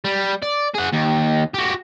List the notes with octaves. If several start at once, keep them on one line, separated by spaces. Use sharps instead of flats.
G3
D5
G#4 F#5
D#2
F#4 G4